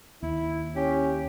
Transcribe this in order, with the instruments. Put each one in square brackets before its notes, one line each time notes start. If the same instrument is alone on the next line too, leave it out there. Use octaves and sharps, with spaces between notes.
[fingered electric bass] D#2 [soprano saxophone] E4
[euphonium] C#4 [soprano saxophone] G4